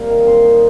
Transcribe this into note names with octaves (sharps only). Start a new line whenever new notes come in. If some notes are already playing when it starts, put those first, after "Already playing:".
Already playing: G3 A#3 C4 F5
D#3
C4 C6
D#4